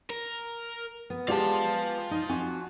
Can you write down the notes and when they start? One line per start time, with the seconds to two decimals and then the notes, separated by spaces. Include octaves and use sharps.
0.10 A#4
1.10 B3
1.28 G#3 F4 G4 D5 F5 A5 C6
2.11 D#4
2.29 F2 F#4 G#5